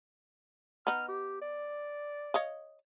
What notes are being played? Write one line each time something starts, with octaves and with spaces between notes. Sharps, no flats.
B3 D#4 F6
G4
D5
C#5 D#5 F5